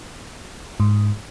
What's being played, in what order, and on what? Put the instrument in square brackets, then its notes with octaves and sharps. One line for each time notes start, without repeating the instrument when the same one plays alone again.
[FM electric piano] G#2